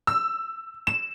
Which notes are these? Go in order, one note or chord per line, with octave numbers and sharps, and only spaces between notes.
E6
E7